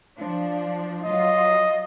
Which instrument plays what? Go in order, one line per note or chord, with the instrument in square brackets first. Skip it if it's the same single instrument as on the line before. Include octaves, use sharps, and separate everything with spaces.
[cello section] F3 D4
[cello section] F#3 F4 [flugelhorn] D#5